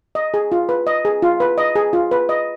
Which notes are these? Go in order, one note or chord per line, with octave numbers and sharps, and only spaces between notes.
D#5
G#4
F4
B4
D#5
G#4
F4
B4
D#5
G#4
F4
B4
D#5